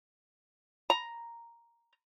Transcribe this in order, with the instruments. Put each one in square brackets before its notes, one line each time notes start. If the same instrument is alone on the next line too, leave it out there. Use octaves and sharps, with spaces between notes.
[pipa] A#5